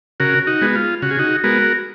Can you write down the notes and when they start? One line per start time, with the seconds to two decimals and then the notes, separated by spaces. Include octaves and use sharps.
0.20 C#3 F#4 A#4
0.47 D#4 F#4
0.62 G#3 B3
0.75 F4
1.02 C#3 F#4
1.11 G#4
1.19 D#4 F#4
1.44 G#3 B3 F#4 A#4